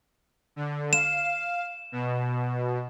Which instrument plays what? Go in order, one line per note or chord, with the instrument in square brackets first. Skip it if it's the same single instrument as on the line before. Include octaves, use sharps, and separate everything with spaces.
[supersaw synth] D3
[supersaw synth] F5 [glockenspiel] E7
[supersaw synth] B2